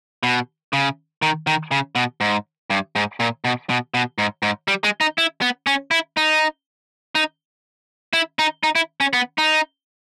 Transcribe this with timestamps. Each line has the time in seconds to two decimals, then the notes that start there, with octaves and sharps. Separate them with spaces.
0.23 B2
0.73 C#3
1.22 D#3
1.47 D#3
1.71 C#3
1.95 B2
2.21 G#2
2.70 G2
2.96 G#2
3.20 A#2
3.45 B2
3.70 B2
3.94 B2
4.18 G#2
4.43 G#2
4.68 G3
4.84 G#3
5.01 D#4
5.18 E4
5.42 B3
5.67 C#4
5.91 E4
6.17 D#4
7.15 D#4
8.13 E4
8.39 D#4
8.63 D#4
8.75 E4
9.00 C#4
9.13 B3
9.38 D#4